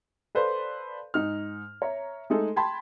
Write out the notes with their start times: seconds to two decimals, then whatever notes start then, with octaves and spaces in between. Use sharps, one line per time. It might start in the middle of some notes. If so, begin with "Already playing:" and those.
0.35 A4 B4 C5 D5 F5
1.14 G#2 D#4 F6
1.82 C#5 E5 A#5
2.30 G#3 A3 D#4 G#4 A4
2.56 G5 A5 B5 C6 G#6